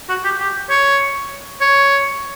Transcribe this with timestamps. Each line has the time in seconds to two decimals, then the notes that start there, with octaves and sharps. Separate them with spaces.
0.09 F#4
0.25 G4
0.39 G4
0.70 C#5
1.62 C#5